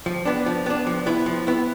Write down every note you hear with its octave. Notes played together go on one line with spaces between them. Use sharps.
F3
B3 D4
F3
B3 D4
F3
B3 E4
F3
B3 E4